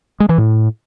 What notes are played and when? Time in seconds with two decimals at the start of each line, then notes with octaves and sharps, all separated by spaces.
0.20 G#3
0.29 E3
0.38 A2